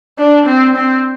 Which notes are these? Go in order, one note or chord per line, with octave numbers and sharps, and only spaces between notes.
D4
C4
C4